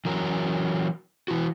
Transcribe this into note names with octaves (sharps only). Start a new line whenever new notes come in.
E3 F#3 A#4
E3 E4 F#4